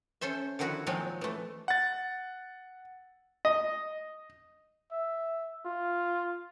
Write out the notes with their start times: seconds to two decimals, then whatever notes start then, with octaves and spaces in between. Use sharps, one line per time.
0.21 C#4 A4 C5 E5
0.59 D3 D#3 F3 E4 F#4
0.87 A#2 D#3 F3 F#3 G#3 C4
1.21 E3 A3
1.68 F#5 A6
3.45 D#5
4.92 E5
5.66 F4